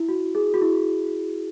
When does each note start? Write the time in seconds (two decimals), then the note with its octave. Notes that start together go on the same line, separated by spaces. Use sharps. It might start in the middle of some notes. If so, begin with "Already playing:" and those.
Already playing: E4
0.09 F#4
0.35 G#4
0.54 F#4
0.61 E4